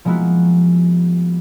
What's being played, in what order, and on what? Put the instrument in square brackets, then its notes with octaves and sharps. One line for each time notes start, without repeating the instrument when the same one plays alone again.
[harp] F3 G#3 A#3 B3 E4 F#4